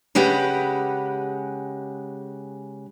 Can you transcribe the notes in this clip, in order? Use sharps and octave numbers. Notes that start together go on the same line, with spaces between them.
C#3 G#3 G4 B4 F#5